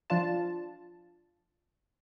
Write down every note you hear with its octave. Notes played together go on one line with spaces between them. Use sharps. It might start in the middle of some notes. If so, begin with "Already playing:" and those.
F3 D4 F4 A5